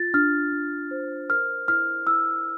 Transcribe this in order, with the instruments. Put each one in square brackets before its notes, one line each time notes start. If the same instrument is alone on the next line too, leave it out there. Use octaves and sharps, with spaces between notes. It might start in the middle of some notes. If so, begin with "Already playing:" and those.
Already playing: [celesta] F4 A6
D4 F6
D4
C5
A#4 F6
E4 F6
E4 E6